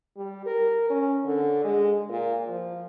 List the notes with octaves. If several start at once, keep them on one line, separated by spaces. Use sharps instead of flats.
G3
A#4
C#4
D3
G#3
A#2
F3